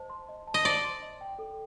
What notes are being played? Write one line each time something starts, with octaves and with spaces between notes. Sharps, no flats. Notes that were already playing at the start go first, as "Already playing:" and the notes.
Already playing: C5 D#5 A5
C6
D#5
A5
D#5
C5 D5
C6
D#5
G5
A4